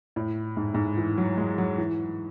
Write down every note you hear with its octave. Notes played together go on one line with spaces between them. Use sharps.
A2
G#2
G#2
E3
F#3
G#3
F#3
E3